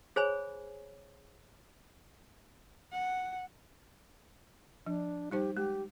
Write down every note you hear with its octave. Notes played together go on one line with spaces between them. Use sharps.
G#4 C5 C#5 G#5 B5
F#5
F3 D4
G3 D#4 G4 C5
G#3 G4